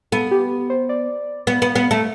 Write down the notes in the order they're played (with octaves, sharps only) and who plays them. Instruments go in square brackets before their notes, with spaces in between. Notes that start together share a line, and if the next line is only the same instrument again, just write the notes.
[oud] B3 [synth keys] A4
[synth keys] G4
C5
D5
[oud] B3
B3
B3
A3